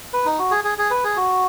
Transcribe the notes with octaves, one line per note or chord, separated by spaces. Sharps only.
B4
D#4
F#4
G#4
G#4
G#4
B4
G#4
F#4